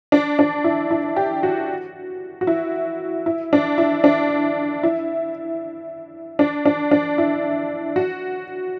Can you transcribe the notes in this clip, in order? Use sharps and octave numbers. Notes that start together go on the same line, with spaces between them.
D4
D4
E4
E4
G4
F#4
F#4
E4
E4
D4
E4
D4
E4
D4
D4
D4
E4
F#4